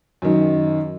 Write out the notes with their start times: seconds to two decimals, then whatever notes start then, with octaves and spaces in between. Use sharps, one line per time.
0.22 F#2 D#3